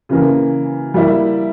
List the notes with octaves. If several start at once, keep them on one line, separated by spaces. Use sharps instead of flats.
C#3 E3 A#3
G3 A#3 E4